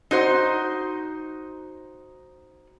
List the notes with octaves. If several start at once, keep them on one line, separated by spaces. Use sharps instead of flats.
D#4 F#4 C5